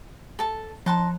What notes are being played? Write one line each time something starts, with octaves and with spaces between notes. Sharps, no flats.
A4 A5
F3 D#4 A5 C6 F#6